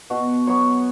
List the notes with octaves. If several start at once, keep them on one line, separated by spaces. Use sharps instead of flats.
B2 F#4
F#3 B3 C#5